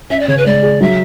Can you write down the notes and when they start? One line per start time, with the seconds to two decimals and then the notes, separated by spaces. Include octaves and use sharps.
0.10 C#4 E5
0.19 D5
0.28 C#3 C#5
0.37 B4
0.46 G#3 D5
0.63 G#4
0.81 F#3 E5